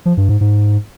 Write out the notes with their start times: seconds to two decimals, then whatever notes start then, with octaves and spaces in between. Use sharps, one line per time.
0.06 F3
0.17 G2
0.29 G#2
0.41 G#2